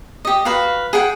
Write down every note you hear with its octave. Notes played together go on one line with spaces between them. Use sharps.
G4 D#5
F#4 B4 F5
G#4 F#5 G5